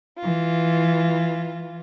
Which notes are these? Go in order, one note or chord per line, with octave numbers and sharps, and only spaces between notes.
E3 F4